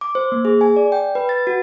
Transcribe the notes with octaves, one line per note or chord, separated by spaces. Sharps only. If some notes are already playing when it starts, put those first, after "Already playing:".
D6
C5
A#3
G#4
G#5
D5
G5
B4
A6
F#4